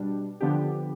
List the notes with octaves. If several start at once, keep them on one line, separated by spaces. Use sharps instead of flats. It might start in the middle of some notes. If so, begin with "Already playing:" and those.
Already playing: B2 G3 D4
D3 F3 B3 D4 G4